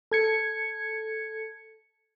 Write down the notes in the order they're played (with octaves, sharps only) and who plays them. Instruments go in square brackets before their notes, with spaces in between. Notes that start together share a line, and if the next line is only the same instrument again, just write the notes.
[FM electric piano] A4 G#6 C#7